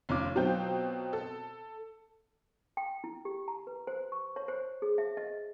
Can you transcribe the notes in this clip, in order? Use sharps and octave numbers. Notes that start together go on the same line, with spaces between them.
F1 C#4 F4 D6
B2 F#3 C4 F4 G5 G6
A4
G5
E4
G4
A#5
B4
C5
C#6
C#5
C5
G#4
E5
D#5